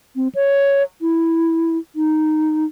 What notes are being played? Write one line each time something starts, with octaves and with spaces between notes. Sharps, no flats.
C4
C#5
E4
D#4